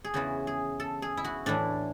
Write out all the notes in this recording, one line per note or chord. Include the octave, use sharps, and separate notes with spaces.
G#4
E2 C#3 E3 F#4
G#4
A4
G#4
E4
F#4
A2 E3 D4